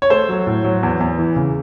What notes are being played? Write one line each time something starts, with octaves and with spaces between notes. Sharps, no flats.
C#5
A3 C5
F#3
A2
F#3
E2
E2
E3
C#3